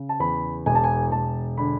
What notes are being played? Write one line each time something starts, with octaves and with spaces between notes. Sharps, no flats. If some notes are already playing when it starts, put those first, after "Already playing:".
Already playing: C#3
A5
E2 B5
E1 G#5
A5
G#5
E1 A5
D3 B5